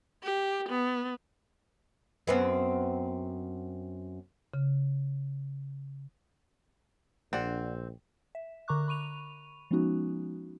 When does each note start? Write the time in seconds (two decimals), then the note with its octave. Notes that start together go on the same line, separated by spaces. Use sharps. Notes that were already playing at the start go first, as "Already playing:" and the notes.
0.24 G4
0.69 B3
2.27 F#2 B3 C4
4.54 C#3
7.33 A#1 C4 D4 D5 F#5
8.35 E5
8.68 D3 A#4 A#5 C#6 D6 F#6
8.88 B5 C#6 D#7 F7
9.71 F3 G#3 B3 C#4 D#4 F#4